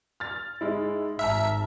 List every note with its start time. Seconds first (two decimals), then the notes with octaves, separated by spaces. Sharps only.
0.20 F6 A6
0.61 G#2 G#3 E4
1.19 G#1 E5 A5 A#5 F6